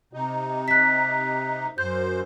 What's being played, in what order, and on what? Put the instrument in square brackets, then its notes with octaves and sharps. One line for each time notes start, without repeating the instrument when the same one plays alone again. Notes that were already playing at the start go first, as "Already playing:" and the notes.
[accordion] C3 D#4
[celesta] F#6 B6
[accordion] F#2 C5 [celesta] G6